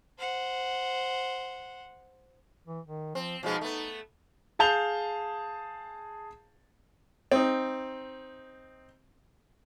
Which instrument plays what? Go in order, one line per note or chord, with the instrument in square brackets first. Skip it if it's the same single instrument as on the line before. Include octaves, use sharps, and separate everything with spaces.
[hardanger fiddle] C5 F#5
[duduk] E3
D#3
[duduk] F3 [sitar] C4
[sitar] B2 F3 G#3 [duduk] D#4
[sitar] A3 B3
[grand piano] G#4 F5 A5 G6 F7 G7
[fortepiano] C4 D#4